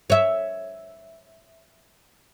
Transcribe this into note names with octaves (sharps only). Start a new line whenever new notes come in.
C#5 E5